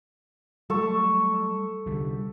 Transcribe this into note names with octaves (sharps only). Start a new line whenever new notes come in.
F#3 G3 A3 A4 A5 C#6
C2 D3 G3